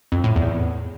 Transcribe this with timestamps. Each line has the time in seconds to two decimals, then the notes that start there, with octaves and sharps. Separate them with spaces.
0.12 F2
0.24 A2
0.36 E2